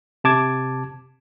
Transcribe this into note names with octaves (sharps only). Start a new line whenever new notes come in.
C3 A5 D6 G#6